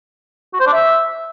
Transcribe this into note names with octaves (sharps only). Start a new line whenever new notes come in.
F#4
C5
D4
E5